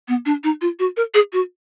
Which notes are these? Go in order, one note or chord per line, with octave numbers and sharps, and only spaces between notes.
B3
D4
D#4
F4
F#4
A#4
G#4
F#4